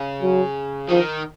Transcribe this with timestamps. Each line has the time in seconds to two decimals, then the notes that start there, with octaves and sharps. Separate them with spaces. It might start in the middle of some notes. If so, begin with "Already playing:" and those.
Already playing: C#3
0.22 F#3
0.89 D#3 F3